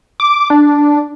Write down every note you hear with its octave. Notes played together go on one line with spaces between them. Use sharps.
D6
D4